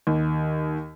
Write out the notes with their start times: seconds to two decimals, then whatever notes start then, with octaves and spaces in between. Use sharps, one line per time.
0.07 D#2